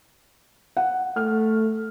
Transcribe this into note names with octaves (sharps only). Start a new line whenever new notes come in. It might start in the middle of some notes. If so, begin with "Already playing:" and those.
F#5
A3 F6